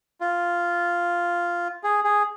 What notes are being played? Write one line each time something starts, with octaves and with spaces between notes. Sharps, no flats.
F4
G#4
G#4